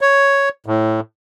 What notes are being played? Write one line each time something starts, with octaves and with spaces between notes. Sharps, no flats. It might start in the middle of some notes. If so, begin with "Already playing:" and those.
C#5
A2